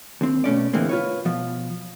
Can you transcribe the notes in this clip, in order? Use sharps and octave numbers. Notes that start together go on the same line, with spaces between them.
D#2 C4
B2 A3 C#4 D5
A2 D3 E3 G#3 A#3 C4
F4 B4 C#5
B2 F3